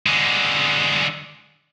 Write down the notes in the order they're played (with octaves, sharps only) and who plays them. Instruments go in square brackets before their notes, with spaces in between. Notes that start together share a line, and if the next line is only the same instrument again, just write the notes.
[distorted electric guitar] D3 G#3